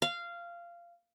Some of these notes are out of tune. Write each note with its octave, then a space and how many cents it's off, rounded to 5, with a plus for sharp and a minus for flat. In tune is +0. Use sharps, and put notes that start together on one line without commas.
F5 -15